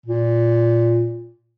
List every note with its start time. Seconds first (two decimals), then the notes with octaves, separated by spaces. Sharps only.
0.06 A#2